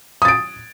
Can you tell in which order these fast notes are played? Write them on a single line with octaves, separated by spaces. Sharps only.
D#6 A6 D7